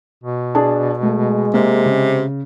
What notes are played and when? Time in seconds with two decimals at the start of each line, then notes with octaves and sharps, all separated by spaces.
0.23 B2
0.55 D4 G#4 A5
1.03 G#3 A3
1.54 C3 A#3
1.86 C#3